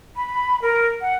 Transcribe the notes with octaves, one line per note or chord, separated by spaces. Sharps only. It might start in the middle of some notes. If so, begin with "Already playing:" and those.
B5
A#4
F#5